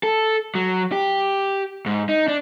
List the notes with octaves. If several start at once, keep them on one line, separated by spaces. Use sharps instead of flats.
A4
F#3
G4
G#2
D#4
D4